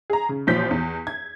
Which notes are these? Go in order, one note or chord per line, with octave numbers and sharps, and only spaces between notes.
G#4 A#5
C#3
A1 A#2 F3 G6 B6
E2
G#6